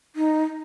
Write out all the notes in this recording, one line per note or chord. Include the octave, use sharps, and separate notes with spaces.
D#4